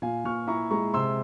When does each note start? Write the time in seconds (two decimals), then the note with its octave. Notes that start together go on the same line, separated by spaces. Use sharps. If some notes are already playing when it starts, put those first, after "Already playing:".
0.02 A#2 F5 G#5
0.25 A#2 C#6 F6
0.47 E4 A#5 C#6
0.71 G#3 A#5 C#6
0.94 C3 C6 E6